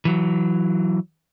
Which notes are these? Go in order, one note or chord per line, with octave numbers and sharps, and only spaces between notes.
E3 F#3